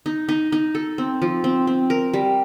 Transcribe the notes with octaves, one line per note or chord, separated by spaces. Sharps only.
D#4
D#4
D#4
A4
C4
F3
C4
C4
A#4
G3